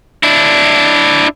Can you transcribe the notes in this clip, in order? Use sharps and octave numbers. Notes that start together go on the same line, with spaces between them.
D4 E4